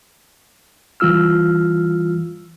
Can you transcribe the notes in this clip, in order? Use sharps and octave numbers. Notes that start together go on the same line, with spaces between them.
E3 G3 F4 E6 F6